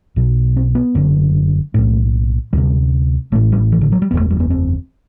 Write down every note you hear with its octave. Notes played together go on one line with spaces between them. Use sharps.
B1 B2
C4
B3
F#1 F#2 D3
B1 A2 A3
D2 C3 G3
A1 A2 A3
G3
E3
D3
F#3
G3
F#1 E2 D3 B3
A3
G3
B3
C4